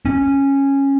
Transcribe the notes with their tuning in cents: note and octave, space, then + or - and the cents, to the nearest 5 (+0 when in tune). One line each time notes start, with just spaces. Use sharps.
C#4 -10